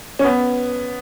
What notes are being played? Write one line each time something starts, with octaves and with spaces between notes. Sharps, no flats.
C#4
B3